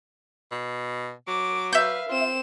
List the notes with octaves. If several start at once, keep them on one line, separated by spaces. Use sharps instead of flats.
B2
F#3 D6
B4 E5 F5 G6
C4 F4 E7